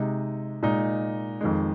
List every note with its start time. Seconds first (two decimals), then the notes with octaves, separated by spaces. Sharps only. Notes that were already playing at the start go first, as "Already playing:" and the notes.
Already playing: C3 G#3 D#4
0.63 A#2 G#3 D#4
1.41 F2 D#3 G#3